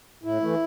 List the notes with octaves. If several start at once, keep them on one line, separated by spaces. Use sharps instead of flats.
A2 E4
E3 A3